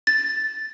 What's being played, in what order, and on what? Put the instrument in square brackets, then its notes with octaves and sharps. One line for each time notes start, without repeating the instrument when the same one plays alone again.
[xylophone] A6